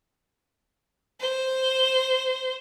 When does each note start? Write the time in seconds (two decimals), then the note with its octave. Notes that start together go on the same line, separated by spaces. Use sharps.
1.20 C5